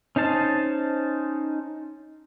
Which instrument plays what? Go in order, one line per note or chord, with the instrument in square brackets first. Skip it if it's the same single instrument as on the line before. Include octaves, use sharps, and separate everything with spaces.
[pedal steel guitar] C#4 D#4 C5 A5